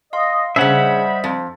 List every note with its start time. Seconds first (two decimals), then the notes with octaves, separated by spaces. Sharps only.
0.13 D#5 F5 C6
0.56 C#3 G3 C#4 C5 D#5 E5 F#5 B5
1.24 F2